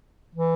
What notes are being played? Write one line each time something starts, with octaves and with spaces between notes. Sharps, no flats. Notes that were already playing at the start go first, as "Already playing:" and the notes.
E3